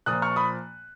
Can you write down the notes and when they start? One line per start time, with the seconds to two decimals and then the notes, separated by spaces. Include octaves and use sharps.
0.06 A#2 F3 D#6 F#6
0.22 C#6 F6
0.36 B5 D#6